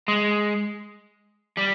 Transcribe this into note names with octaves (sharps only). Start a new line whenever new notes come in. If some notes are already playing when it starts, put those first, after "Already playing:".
G#3
G3